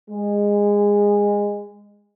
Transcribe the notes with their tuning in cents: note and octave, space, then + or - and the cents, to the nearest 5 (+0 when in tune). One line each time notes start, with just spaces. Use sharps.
G#3 -20